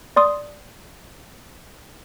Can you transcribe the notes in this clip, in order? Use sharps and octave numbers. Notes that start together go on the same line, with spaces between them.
D5 C6 D#6